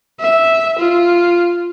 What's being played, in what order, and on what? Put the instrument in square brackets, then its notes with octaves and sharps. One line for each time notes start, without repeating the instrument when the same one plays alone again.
[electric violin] E5
F4